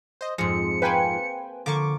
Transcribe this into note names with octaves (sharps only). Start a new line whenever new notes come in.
C5 D#5
F2 G#2 F3 G#3 C4 C#7
A#3 B4 C5 G5 G#5
D3 F3 A#3 C#6 D6